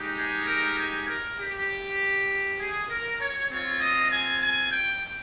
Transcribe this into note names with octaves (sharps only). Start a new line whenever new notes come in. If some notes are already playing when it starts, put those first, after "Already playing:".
Already playing: G#3 D#4 G4
G#4
A#4
G#5
A#4
G4
G#4
A#4
C#5
C4 F4 C#5
D#5
G#5
G#5
G5